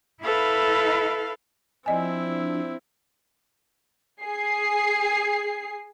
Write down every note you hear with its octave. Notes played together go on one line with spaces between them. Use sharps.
E4 A4 B4 F5
F3 C4 D4 E4 D5 D#5 G#5
G#4 C7